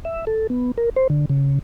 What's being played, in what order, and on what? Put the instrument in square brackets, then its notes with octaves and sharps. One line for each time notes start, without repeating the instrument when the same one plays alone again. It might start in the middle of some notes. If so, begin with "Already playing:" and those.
[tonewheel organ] E5
A4
B3
A#4
C5
D3
C#3